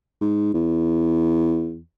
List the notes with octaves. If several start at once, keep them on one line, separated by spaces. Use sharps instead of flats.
G#2
E2